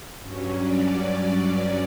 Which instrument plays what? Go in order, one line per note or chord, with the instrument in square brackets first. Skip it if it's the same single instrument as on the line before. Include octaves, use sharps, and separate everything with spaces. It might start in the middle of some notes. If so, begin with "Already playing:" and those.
[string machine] G2 F#3 C#4
D5